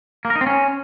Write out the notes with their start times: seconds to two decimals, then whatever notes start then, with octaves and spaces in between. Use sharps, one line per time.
0.25 A#3
0.30 A#4
0.36 D#4
0.41 C4
0.46 C#4